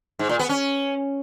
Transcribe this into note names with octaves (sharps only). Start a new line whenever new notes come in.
G#2
A#2
B3
C#4